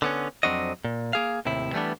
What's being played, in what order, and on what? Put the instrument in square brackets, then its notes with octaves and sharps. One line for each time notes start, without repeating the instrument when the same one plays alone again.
[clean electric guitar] D3 B3 C#4
F2 F#3 C4 D4 F#4 D#5
A#2
A#3 G#4 F5
D#2 A2 C3 E4
E3 G3 A3 B3 D4